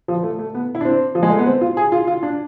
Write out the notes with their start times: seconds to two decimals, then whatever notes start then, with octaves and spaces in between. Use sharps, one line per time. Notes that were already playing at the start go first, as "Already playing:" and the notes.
0.08 F3
0.23 A3
0.39 A3
0.54 B3
0.75 E4
0.81 D4
0.85 C4
1.15 F3
1.23 G#3
1.30 A3
1.39 B3
1.46 C4
1.61 F4
1.77 G#4
1.92 F4
2.07 F4
2.23 D4